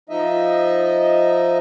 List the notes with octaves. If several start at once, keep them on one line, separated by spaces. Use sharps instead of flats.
F3 D#4 D#5 E5